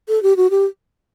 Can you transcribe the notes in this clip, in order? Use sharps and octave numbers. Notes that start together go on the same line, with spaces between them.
A4
G4
F#4
G4